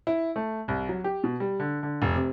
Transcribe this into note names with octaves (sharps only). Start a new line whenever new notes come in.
E4
A3
C2
F#3
G4
B2
G3
D3
D3
F1
C3